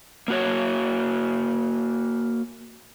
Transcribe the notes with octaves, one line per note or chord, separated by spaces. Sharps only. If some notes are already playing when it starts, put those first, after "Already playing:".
A#3 F#4 C#5